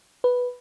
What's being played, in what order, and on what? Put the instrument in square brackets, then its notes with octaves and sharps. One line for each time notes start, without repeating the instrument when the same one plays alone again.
[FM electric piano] B4